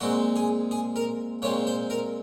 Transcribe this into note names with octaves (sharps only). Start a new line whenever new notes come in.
A#2 G#3 C4 F#4
G#4
G#4
A#4
A#2 G#3 C4 C#5
C5
A#4